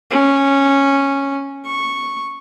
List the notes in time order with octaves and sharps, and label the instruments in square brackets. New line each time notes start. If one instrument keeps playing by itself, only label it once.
[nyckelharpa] C#4
C#6